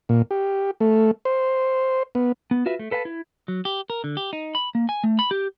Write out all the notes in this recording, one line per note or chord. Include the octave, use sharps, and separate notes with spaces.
A#2
G4
A3
C5
B3
B3
F4 F#4 B4 E5
A3
A4 B4 F5 G5 A5
E4
F#3
G4
A#4
D3
G4
D#4
B5
A#3
G#5
A3
B5
G4